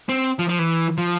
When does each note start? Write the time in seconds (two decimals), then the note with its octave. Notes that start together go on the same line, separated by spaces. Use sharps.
0.09 C4
0.39 F3
0.49 F3
0.59 E3
0.98 F3